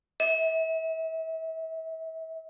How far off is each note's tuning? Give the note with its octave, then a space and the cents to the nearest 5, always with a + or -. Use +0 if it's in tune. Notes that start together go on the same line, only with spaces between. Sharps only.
E5 -35